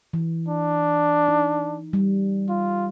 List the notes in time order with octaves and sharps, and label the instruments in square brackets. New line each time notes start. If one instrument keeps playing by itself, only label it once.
[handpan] E3
[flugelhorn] D4
[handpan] D#4
G3
[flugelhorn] F4